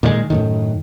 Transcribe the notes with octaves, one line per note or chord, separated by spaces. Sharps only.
A#2 D#3 F3 G#3
F#2 A2 D#3